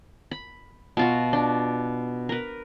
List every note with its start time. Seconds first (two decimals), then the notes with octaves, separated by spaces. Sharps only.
0.31 B5
0.97 B2 F4 F#4
1.33 D4
2.29 A#4 B4